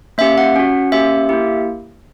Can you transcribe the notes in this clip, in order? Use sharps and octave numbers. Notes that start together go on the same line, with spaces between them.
A#3 C#4 G4 E5
F#5
C#4 F#4
A#3 C#4 G4 E5
A#3 E4 G4